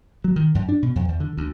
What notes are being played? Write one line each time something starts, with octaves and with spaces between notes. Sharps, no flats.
F#3
D#3
F#2
D4
B2
F2
E2
D3
D2